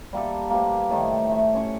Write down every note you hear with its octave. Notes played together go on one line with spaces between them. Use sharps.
G3 A#3 G4 A4
A#3 G4 B4 C5
A2 D#3
E5 C#6
C#4 C#6